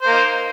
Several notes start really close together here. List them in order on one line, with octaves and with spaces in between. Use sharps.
C5 A#3 D#4